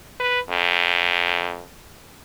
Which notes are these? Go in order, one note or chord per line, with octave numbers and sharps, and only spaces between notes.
B4
F2